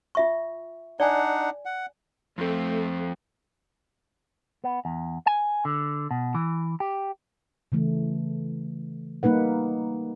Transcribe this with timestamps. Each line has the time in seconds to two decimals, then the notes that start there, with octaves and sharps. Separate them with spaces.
0.15 F4 E5 C#6
1.00 D4 D#4 D5 F#5 G#5
1.65 F#5
2.38 F2 A3 C4
4.64 B3
4.85 E2
5.27 G#5
5.65 D3
6.11 B2
6.35 E3
6.80 G4
7.72 C#3 E3 A3
9.23 G3 A#3 D#4 B4 F#5